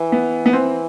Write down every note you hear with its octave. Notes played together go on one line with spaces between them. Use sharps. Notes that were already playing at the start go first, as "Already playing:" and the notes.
Already playing: E3
B3
B3
E3 C4